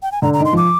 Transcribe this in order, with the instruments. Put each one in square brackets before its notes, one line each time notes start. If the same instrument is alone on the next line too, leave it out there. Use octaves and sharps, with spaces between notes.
[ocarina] G5
G#5
[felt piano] D3 [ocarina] A#5
[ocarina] A#5
[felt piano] D#3
[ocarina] C6
[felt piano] F3 [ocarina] D6